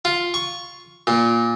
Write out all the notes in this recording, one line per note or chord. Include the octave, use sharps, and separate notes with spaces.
F4
C#6
A#2